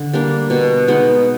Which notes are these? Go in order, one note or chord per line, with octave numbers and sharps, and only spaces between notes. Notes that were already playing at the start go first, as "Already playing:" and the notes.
Already playing: D3
G3 A#3 D4
B2
G#3 B3 D#4